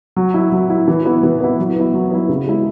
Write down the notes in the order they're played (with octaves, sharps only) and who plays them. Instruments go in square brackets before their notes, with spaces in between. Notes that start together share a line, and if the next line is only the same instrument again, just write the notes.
[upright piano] F#3
E4
F#3
E4
E3
B3 E4
E3
B3 E4
F#3
B3 E4
F#3
B3 E4
C#3
G#3 E4